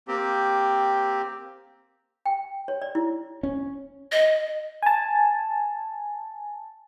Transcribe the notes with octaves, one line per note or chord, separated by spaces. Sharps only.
A#3 C4 G4
G5
C#5
D5
E4
C#4
D#5
G#5 A5